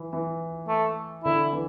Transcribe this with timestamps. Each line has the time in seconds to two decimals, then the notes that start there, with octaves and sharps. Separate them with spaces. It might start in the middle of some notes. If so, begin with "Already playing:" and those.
Already playing: E3
0.13 E3
0.68 A3
1.24 D3 E4
1.53 E3